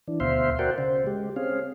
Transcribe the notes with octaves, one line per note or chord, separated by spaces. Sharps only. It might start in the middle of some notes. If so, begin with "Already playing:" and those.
E3 D4
D2 B2 C5 E5 F5 C6
F#4 A#4 C5 D5 F#5 G5
C#3 C5
G#3 G4
C4 C#4 G#4 F5